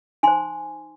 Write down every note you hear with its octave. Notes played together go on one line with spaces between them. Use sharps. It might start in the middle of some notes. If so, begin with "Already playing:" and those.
D#4 C5 G#5 C6